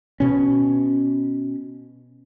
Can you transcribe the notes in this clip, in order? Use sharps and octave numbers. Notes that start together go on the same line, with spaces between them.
B2 C#4